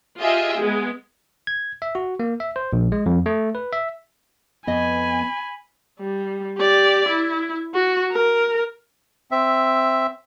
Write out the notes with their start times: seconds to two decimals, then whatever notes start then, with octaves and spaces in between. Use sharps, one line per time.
0.19 F4 G4 G#4 D#5 E5 G5
0.60 G#3 B3
1.47 G#6
1.82 E5
1.95 F#4
2.20 A#3
2.40 E5
2.56 C5
2.73 A#1
2.92 G#3
3.06 F2
3.26 A3
3.55 B4
3.73 E5
4.67 F2 B3 D#5 G#5 B5
6.00 G3
6.58 G4 D5
7.08 E4
7.75 F#4
8.12 A#4
9.31 C4 E5